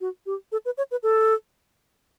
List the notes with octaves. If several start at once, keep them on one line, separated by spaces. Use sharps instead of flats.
F#4
G4
A4
B4
C#5
B4
A4